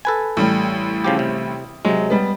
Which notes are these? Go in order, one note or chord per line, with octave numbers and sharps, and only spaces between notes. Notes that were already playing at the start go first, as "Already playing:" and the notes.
A4 B4 G#5
A1 G3
C#3 F3 G4
C3
C3 F#3 G#3
G3 B3